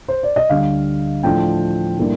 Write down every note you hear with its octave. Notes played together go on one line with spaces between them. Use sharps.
C5
D5
D#5
D2 D3 G3 F5
A2 F3 A3 D4 G5
A2 G3 A#3 D4